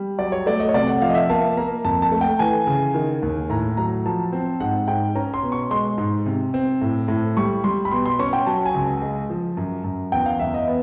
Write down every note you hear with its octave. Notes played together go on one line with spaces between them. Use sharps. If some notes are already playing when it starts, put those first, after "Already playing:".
Already playing: G3
F#3 D5
C#5
A3 D5
D#5
C#5
C3 D5
F#5
F3 F5
D#5
E5
A#3 A5
A#3 A#5
F2 A5
A5
A3
G5
E3 G#5
C#3
D#3
D#2
A2 A#5
F#3 A#5
F3 A5
C4
G#2 F#5
G#2 G5
C#4 A#5
C6
B2
C#6
G#3 C6
G#2
C3
C4
A2
A2
G3 C#6
G3 C6
B5
B2 C6
C6
C#4 C#6
G5
F#3 A5
G#5
C#2
G#3
F3
F#2
F#2
E2 G5
F5
E2 E5
D#5
B3